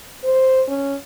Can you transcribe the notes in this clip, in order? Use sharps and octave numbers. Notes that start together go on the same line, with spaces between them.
C5
C#4